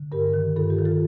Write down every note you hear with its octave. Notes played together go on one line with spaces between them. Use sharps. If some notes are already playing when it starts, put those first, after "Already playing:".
Already playing: D3
G2 G4 A#4
D#3
G2 F4 A4
G4
D#3
F4 A4